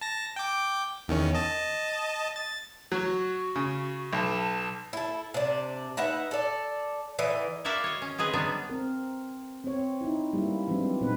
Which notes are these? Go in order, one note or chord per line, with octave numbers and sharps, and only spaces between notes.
A5 A#6
G5 D6
E2 D#3 C#4
D#5 A5
A6
F#3 F#4
C#3
B1 A5
E4 A4
C3 D4
D#4 B4 E5 F#5
A4 D5
D3 E3 D#4
E4 F#4 A#4 D5 E5 F5
C#5 D#5
C#4
C4 D#4 G#4 B4
F#3 G3 B3 D4
C4 A#4
C4 C#5
D#4 E4
G3 G#3 A#3 C#4 E4
E3 F#3 G#3 C4 D4
A#2 B3 C4 D4 D#4 B4